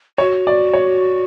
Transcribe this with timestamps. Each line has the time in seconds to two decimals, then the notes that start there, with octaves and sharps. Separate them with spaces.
0.18 F#4 C#5
0.47 D5
0.74 C#5